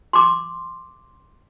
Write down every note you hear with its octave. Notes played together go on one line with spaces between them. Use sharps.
C6 D6